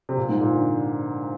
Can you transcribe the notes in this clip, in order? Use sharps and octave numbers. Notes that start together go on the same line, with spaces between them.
C3
A#2
G#2
A#2
D3